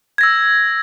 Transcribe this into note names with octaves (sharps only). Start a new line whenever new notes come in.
E6 G#6 A#6